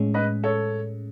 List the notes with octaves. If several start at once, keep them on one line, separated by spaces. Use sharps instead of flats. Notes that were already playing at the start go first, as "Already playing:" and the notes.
Already playing: A2 G#3 C#4
B4 D#5
A4 C#5